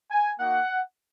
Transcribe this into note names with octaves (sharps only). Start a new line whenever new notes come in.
G#5
A#3 D#4 F#4 F#5